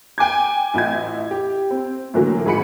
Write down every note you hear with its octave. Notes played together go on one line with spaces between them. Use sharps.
G5 G#5 D6 G#6
A1 E4 D#5 G#6
G4
C4
A2 D3 E3 F#3 A#3
G#1 G#4 B5 C#7